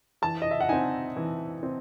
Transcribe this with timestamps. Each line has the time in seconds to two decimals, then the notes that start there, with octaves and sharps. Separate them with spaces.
0.22 E3 A5
0.42 D#5
0.51 E5
0.61 F#5
0.69 C4 D#4 G#5
1.16 E3
1.63 C4